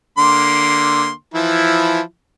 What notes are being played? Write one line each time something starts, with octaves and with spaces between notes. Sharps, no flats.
D3 A#3 C6
E3 F3 E4